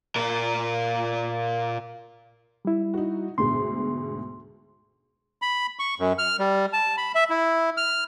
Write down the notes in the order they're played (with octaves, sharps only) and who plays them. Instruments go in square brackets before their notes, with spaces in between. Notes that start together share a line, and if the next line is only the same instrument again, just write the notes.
[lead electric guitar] A#2 A#4
[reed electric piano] G3 E4
[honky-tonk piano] D#4 F#4
[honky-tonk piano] D2 G#2 B2 [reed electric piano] C6
[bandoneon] B5
C#6
F#2
F6
G3
A5
B5
E5
E4
F6